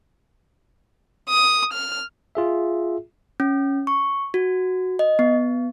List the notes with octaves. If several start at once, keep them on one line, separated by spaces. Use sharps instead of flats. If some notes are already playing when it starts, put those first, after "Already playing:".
D#6
F6
F4 G#4 E5
C#4
C#6
F#4
D#5
B3